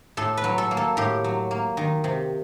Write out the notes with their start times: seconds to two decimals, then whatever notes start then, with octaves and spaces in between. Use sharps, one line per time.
0.17 A2 A4
0.37 B4
0.44 F#3
0.58 A4
0.71 A#3
0.77 A4
0.97 A2 G4
1.24 F#3
1.51 A#3
1.77 D#3
2.04 C3